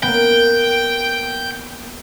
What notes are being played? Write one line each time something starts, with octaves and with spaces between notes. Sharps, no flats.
A#3 B3 G5